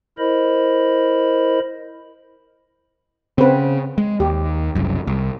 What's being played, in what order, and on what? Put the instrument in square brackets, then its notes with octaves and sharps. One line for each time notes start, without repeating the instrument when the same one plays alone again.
[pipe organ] E4 A#4 C5 D#5 B5
[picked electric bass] C#3 [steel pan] C4 B4
[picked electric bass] G#3
[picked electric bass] D#2 [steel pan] G4
[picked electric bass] F#1 C2 F#2
C2